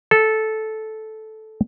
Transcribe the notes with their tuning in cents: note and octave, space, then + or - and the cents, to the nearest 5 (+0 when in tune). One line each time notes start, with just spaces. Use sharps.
A4 -10